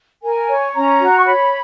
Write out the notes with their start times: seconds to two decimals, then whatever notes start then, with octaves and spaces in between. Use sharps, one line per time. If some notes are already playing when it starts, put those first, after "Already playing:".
0.23 A#4 G#5
0.49 C#5
0.75 C#4 A#5
1.00 F#4
1.17 C#6
1.25 C#5 B5